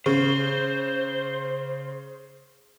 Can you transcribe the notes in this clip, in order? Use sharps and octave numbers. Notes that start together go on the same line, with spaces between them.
C#3 C5